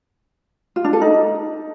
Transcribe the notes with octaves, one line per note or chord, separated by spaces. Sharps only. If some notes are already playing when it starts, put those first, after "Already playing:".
F4
D4
A4
D#4